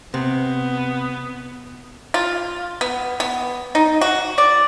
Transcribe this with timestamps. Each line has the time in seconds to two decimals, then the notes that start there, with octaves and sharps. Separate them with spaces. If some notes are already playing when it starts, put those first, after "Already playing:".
0.14 C3 B3
2.14 F4
2.81 B3
3.20 B3
3.75 D#4
4.01 F#4
4.38 D5